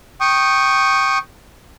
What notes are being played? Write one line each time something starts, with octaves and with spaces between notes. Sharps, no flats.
G5 C#6 D#6